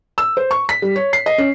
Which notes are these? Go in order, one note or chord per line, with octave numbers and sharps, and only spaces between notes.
E6
C5
C#6
B6
G3
C#5
C7
D#5
C#4